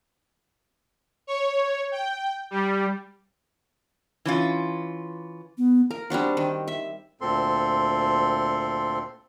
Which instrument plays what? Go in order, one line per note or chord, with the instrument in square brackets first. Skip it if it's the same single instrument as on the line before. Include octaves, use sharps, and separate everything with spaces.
[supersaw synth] C#5
G5
G3
[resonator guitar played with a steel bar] E3 C#4 F4
[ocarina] B3
[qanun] A#4
G3 C4 D4 F#4
D#3
E5
[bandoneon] D2 A#2 C4 A4 C6